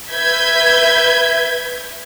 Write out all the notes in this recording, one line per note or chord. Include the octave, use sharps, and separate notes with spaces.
B4 E5 G6 G#6 B6